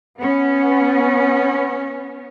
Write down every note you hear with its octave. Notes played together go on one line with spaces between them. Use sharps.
B3 C#4